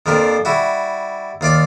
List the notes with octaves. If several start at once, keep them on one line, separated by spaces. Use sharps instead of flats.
F2 F3 A#3 D4 G4
G3 E4 F#4
D#2 F4 D5 D6